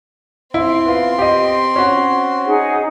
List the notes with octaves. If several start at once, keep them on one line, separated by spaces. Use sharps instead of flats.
C4 E4 C6
B3 F4
G4 D#5
C#4 F#4
D#4 G#4 F#5